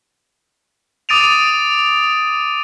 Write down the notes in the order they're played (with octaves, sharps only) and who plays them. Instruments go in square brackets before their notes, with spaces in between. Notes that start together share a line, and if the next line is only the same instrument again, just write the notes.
[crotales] D6 D#6 A6 D7 D#7 F7